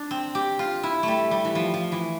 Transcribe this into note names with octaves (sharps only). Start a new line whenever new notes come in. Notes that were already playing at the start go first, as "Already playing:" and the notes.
Already playing: D4
C4
G4
F4
E4
G3 A3
G3
E3
F3
F3
E3